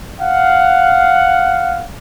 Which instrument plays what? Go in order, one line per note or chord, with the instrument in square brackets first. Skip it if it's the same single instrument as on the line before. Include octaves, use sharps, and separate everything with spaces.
[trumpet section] F5 F#5